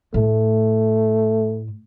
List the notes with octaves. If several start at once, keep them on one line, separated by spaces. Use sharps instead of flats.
A2 A3